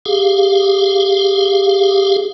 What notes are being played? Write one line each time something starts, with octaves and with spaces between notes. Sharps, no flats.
G4 G#4 F5